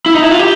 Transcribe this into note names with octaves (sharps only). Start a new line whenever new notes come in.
E4
D#4
E4
F4
G4